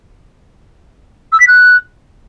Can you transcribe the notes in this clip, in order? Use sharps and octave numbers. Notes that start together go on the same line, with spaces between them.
E6
B6
F#6